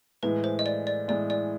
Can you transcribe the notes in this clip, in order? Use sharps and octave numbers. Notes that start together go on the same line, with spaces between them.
A2 E3 G#3 B4
C5
D#5
D5
D5
A2 E3 G#3 D5
D5